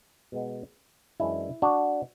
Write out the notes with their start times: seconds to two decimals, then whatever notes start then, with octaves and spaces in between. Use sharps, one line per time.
0.32 B2 G#3 B3
1.20 F#2 E3 G#3 D4 E4
1.62 D4 F#4